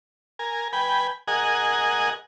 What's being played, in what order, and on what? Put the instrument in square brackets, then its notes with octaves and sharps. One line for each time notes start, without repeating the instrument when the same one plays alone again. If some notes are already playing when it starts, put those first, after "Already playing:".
[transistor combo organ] A#4 G#5
B4 G5 G#5 B5
G#4 A#4 D#5 F#5 G#5